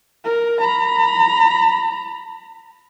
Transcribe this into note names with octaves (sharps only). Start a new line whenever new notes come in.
A#4
A#5 B5